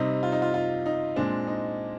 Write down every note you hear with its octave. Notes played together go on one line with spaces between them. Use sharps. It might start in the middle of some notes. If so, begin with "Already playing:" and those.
Already playing: C3 G3 C4 D#4
F4
D#4
F4
F4
D#4
A#2 G#3 C4 D4
D#4